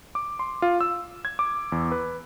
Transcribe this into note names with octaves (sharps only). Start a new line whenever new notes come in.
D6
C6
F4
E6
G#6
D6
E2
B4